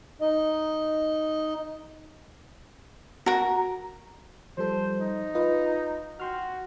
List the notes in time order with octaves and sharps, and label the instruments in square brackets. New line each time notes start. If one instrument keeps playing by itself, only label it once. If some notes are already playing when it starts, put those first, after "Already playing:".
[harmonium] D#4 D#5
[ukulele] F#4 [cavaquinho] A#4 A#5
[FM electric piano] F3 G3 A4 [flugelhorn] C5
[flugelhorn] D#4
[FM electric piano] F4 B4 D#5
[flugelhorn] F#4 [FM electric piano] G5 C6 F6